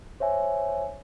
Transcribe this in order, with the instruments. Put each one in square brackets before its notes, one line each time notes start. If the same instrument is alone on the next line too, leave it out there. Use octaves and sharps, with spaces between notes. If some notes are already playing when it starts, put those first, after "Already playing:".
[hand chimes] C5 C#5 E5 G#5